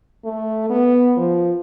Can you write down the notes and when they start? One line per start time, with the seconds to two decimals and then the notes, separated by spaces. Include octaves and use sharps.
0.25 A3
0.70 B3
1.17 F3